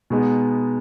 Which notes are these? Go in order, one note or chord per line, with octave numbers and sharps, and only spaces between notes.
B2 G#3 B3 D#4